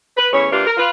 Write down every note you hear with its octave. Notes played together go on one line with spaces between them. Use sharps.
B4
E2 A2 C#4 E4 C#5
E3 A#3 D4 F4 G4 A#4
A#4
F4 B4